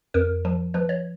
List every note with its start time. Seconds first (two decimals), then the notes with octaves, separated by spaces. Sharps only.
0.14 F2 A#4
0.45 F3
0.74 F3 B4
0.89 C#5